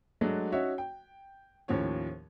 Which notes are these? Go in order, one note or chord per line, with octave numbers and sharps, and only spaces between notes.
F#3 G#3 A3 D4 F#4
C#4 D#4 F#4 C#5 E5
G5
D#2 A2 F3 C#4 C#5